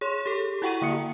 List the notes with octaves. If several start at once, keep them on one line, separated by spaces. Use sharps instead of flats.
G#4 C#5 C6
G4 A4
E4 F#4 F#5 G5 C#6 D#7
D3 A#3 D#6 C#7